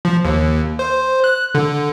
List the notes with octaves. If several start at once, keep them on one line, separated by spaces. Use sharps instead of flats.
F3
D#2
C5
F#6
D3